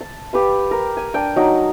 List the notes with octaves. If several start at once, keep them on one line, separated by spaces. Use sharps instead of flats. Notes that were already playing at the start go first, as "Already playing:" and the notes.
A5
G4 B4 F5
A#4
G#5
D4 G5
F#3 D#4